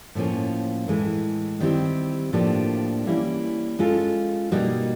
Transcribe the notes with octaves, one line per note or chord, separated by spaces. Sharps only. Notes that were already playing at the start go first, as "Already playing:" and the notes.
A2 F3 A#3 C#4
A2 E3 G#3
D#3 G3 C4 E4 G4
A2 F3 A#3 D4 G4
E3 G3 A#3 C#4 E4
G#3 C#4 F4 A4
B2 G3 A#3 D#4 F#4